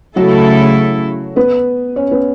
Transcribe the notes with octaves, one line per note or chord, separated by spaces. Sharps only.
C#3 F#3 A3 E4 F#4 A4
B3 B4
C#4 C#5
B3 B4